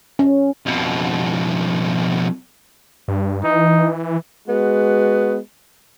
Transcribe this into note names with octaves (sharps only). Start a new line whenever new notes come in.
C#4
F2 B2
G2
E3 D#4
G#3 B3 F#4